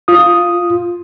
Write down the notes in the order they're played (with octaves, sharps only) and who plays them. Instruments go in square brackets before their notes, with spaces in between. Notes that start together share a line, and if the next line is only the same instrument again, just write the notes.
[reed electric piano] F4 D#6